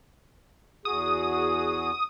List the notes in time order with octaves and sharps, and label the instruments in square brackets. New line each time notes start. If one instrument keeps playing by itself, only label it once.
[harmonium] E2 F#4 G#4 [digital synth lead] D#6